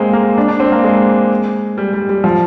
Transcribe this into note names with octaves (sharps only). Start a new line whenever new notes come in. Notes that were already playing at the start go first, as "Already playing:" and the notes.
Already playing: G#3 A#3 C4
A#3
D4
D4
C4
A#3
G#3
G3
G3
G3
F3